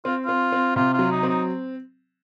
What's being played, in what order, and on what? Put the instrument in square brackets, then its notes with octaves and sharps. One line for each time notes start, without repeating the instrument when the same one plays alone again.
[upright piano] C4 [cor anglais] F4
[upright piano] C4 [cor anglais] F4
[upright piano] C4
[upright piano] C3 [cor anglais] F4
[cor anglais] F4
[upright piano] F#3
[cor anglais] D#4
[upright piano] C4
[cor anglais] D#4